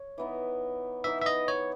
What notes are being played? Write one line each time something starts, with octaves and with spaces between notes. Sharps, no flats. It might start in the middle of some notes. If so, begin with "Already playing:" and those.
Already playing: C#5
E3 B3 D#4
E3 B3 D#4 E5
E5
D#5
C#5